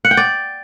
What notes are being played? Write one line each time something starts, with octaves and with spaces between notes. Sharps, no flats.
F#5
G5
D5